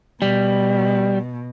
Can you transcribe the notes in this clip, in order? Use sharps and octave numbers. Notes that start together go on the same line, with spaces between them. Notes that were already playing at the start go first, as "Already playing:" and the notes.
B2 G3